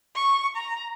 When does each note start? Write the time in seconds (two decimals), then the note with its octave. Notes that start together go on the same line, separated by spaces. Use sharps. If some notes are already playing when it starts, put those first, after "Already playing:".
0.15 C#6
0.56 A#5